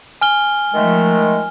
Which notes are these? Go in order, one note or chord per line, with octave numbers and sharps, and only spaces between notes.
G#5 F6 G7
D#3 F3 G#3 A3